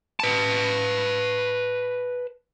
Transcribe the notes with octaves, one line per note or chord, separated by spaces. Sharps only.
B4 A5